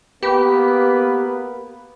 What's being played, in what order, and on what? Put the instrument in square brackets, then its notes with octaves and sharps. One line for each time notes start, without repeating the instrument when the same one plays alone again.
[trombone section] A#3 B3 [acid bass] G4 [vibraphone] B4 B5